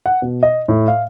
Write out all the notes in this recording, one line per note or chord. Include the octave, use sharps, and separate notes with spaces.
F#5
B2
D#5
A2
F5